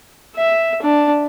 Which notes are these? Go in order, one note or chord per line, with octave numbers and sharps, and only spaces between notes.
E5
D4